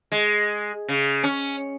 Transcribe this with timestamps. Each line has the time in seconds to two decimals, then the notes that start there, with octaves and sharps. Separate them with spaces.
0.12 G#3
0.88 C#3
1.23 C#4